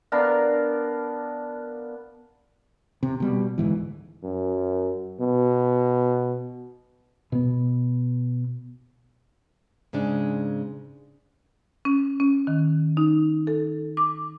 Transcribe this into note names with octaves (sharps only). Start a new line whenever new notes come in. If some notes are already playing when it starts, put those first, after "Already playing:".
B3 D4 A#4 F5
C3
B2 G3
D2 G#2 E3
F#2
B2
B2 B3
G#2 C#3 G#3 D4
C#4
C#4
D#3
D#4
A4
D6